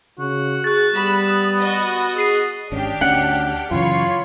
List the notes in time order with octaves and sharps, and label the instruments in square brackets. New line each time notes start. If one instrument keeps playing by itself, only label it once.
[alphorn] C#3 [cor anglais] F#4
[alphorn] G#4 [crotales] F#6 A6
[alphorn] G3 [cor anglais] B3 [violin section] B5 E6
[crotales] D#6
[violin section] F#4 D#5
[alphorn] G#4 [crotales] D#6 C7 D#7
[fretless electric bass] G#1 C#4 [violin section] D4 G4 F6
[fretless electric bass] D2 C#4 [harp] F#5
[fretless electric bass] F#2 C#3 E3 [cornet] F4 [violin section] C#5 B5 C7